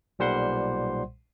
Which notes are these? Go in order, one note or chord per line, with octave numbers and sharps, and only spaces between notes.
B1 A#2 G3 C5 F#5 C6